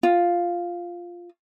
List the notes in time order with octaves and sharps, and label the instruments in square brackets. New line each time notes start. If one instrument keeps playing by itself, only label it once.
[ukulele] F4